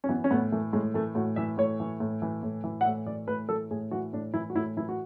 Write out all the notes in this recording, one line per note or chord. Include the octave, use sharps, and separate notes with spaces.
C#4
E3 B3
C#4
A2 B3
E3 A3
A2 G#3
E3 A3
A2 F#4
E3 E5
A2 C#5
E3
A2
E3
A2
E3
F#5
A2 E5
E3 D5
A2 B4
E3 A4
A2 G#4
E3 F#4
A2 D4
E3 E4
F#4
A2 E4
E3 E4
F#4